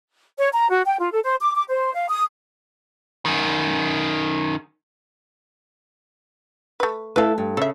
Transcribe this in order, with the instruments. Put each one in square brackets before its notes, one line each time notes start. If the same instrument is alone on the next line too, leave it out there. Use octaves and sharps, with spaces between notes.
[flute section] C#5
A#5
F#4
G5
F4
A4
C5
D6
D6
C5
F5
D#6
[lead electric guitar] F#2 D#3
[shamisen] A3 B4
[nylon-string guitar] A3 E4 A4 [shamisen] B4 F5
[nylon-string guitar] G2
[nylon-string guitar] C#3 [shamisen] A4 E5